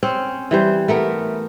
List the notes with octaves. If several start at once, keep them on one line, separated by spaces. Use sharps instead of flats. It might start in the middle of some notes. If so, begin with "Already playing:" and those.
C4 C#4
E3 G3 C5
A3 B3 A#4